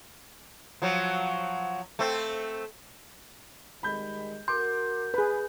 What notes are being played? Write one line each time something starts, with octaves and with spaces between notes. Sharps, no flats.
F3 F#3
A3 C4
D#3 G3 G#3 B5 G6
F#4 A#4 C6 D6 G6
G#4 B4 B5